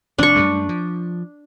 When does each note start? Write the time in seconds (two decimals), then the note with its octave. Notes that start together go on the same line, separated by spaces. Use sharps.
0.18 F1 D4 C#6
0.36 F#2 G3 A3
0.69 F3